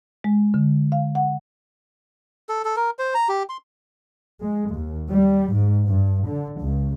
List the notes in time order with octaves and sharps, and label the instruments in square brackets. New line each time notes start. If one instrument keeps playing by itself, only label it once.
[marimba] G#3
D3
F5
F#5
[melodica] A4
A4
A#4
C5
A#5
G4
C6
[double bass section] G#3
D#2
G3
G#2
G2
D3
C#2